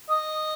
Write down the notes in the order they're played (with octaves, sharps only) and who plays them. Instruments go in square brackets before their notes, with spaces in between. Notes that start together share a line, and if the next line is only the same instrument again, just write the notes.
[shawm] D#5